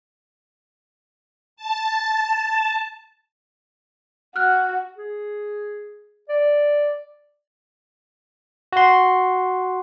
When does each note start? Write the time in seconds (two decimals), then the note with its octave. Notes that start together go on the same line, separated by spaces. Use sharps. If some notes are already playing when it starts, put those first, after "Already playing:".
1.57 A5
4.36 F#4 F6 F#6
4.97 G#4
6.29 D5
8.73 F#4 C6